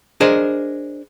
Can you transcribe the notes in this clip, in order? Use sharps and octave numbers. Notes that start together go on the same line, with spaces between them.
D4 G#4 A#4 C5 D#5